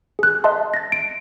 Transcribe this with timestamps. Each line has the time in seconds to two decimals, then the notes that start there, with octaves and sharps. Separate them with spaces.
0.19 G#4 F#6
0.44 D#5 E5 A5 C6
0.74 A6 A#6
0.92 D7